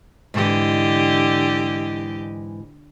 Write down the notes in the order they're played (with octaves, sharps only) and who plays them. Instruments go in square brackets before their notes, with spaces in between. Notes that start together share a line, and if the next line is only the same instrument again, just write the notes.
[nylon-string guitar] G#2 E3 [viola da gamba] D3 G4 D#5